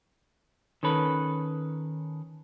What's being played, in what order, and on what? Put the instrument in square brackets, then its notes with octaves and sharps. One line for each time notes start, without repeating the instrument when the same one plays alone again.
[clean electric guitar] D#3 C#4 A4 B4